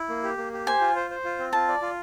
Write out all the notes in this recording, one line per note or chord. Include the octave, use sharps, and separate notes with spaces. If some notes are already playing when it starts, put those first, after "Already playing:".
Already playing: E4
A#3
G4
A#3
G4
C5 G#5
F4
C5
C5
F4
C4
F4 A5
D5
F4